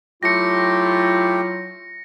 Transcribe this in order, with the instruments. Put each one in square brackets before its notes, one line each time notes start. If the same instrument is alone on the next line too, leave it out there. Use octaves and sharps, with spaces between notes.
[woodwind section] F#3 E4 F4 [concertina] A3 G4 G5 [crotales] A#6 C#7